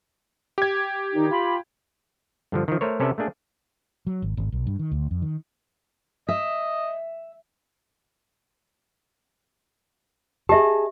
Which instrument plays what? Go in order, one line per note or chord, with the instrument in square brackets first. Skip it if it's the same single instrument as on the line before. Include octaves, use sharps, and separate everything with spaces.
[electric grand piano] G4 G#6
[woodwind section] A#2 D#3 D#4
F4 B5
[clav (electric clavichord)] G2 D3 F3
D#3 F3
A3 A#4 C5 C#5
C3 C#4 A4 B4 D5 E5
A3 A#3 D4 G#4
[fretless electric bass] F#3
G#1
G#1
B1
G2
D#3
D2
F2
D#3
[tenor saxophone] D#5 [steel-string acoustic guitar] E5
[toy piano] G4 E5 [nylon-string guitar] G#4 D#5 A5